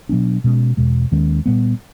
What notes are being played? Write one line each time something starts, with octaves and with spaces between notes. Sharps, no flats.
B2 F#3 B3 D4
B2 G#3 C#4
E2 B2 G#3
D#2 D#3 G#3 C#4
A#2 G3 B3